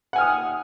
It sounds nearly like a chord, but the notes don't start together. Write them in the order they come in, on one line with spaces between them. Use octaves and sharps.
F#5 G#5 F6 D#6